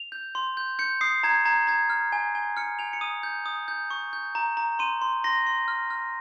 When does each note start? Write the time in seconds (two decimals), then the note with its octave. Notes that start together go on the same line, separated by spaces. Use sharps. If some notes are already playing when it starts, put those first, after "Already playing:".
Already playing: F7
0.12 G6
0.35 C6
0.57 G6
0.79 G6 C#7
1.01 D#6 C7
1.23 A#5 G#6
1.45 A#5 G#6
1.67 A#5 G#6
1.90 F6
2.12 G#5
2.35 G#5
2.57 F6 C#7
2.79 G#5 F7
2.93 C#7
3.01 D#6 D#7
3.23 G6
3.46 D#6
3.68 G6
3.90 C#6
4.13 G6
4.35 A#5
4.57 A#5
4.79 C6 D#7
5.02 C6
5.24 C6 A#6
5.47 C6
5.68 F6
5.90 F6